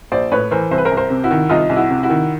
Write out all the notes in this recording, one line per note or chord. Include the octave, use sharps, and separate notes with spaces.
A#1 C5 D5
A2 B4 C#5
E3 A#4 C5
C2 C5
B4
A#4 C5
C2
A#4 C5
C3
E4 F#4
D#3
C2 D#4 F4
C2
E4 F#4
C3
E4 F#4
D#3